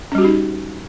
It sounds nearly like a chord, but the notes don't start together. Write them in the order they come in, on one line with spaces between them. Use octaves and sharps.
C#4 G3 F#4 G4 D#4